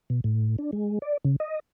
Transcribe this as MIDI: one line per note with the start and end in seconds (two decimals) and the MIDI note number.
0.10 0.20 47
0.24 0.56 45
0.58 0.71 62
0.73 0.99 56
1.02 1.17 74
1.25 1.36 49
1.40 1.60 75